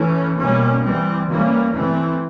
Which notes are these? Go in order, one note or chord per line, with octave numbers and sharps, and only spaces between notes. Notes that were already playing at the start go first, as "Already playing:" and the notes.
Already playing: E3 A3 C#4
B2 G3 A#3 C#4
E3 G3 C4
E3 G3 A#3 C#4
E3 A3 C4